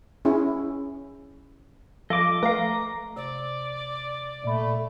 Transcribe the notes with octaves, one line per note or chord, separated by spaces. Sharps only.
C#4 E4 G#4
F3 A4 D#5 D6
A3 B4 F5 A#5
C3 D5
A#2 A3 D5 B5